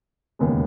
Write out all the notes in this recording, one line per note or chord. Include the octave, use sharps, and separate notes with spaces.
E1 D#2 C#3 G#3 B3